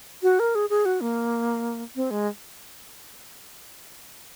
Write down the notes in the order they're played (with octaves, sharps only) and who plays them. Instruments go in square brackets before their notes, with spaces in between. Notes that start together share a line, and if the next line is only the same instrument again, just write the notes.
[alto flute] F#4
A#4
G#4
G#4
F#4
A#3
C4
G#3